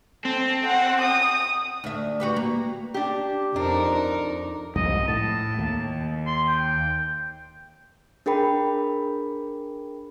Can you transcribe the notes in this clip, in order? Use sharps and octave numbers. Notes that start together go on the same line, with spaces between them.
C4 A4
F#5
D#6
D2 E5
F#4 G4 B4
A#3
D4 G4
F2 D4 D#4 A#4
C2 F2 G#2 D#5
A2 A5
D#2
C6
G5
D4 G#4 A#4 G5 B5